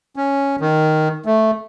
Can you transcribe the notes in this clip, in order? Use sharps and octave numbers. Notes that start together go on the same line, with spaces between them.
C#4
D#3
A3